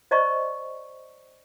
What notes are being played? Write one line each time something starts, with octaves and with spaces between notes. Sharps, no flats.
C5 D5 D#5 A#5 C#6